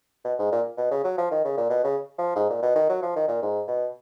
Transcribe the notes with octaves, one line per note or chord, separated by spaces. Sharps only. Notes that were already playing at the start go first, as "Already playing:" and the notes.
B2
G#2
A#2
B2
C#3
F#3
F3
D#3
C#3
A#2
B2
C#3
F3
G#2
A#2
B2
D#3
F#3
F3
D#3
A#2
G#2
B2